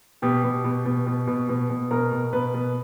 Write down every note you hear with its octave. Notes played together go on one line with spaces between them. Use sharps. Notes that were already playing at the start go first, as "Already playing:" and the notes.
B2 G4
B2
B2
B2
B2
B2
B2
B2
B2 A#4
B2
B2 B4
B2